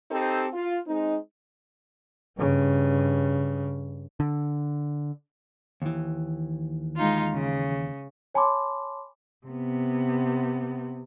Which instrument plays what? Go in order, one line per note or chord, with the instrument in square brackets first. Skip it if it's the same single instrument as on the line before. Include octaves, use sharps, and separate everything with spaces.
[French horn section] C4 D#4 G4 A4 C5
F4
G#3 C4 D#4
[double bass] G2 C#3
[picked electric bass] D3
[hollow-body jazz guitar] D#2 E3
[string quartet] G#3 D#4 F4
C#3
[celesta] C#5 G#5 A5 B5 C6 D6
[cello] C3 B3